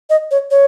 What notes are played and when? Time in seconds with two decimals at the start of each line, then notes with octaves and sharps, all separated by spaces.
0.10 D#5
0.31 C#5
0.51 C#5